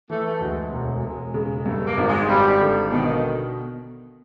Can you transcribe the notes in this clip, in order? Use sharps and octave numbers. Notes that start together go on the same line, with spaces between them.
E3 A3
A3
D2 G#3
E1 G#3
E1
C#3
G2 A3
A#3
G#1
G#3
G#1 G3
D3
B2 D#3